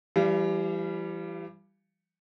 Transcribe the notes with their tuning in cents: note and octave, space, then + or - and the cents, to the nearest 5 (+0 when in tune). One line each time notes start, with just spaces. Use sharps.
E3 +40 G3 +0 F5 -25